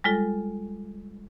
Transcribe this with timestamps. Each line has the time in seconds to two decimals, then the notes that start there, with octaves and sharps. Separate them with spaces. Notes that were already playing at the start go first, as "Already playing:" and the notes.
0.04 G3 G#3 F4 A4